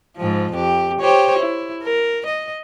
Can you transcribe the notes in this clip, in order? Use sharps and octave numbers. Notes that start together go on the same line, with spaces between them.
G#2 F3
F2 G4
G4 C5 C#5
E4
A#4
D#5